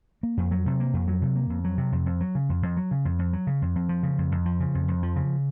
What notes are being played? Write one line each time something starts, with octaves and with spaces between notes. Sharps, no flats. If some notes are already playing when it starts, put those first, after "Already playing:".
A#3
F2
F#3
C3
A#3
F2
F#3
C3
A#3
F2
F#3
C3
F2
F2
F#3
C#3
F2
F2
F#3
C#3
F2
F2
F#3
C#3
F2
F2
F3
C#3
F2
F2
F3
C#3
F2
F2
F3
C#3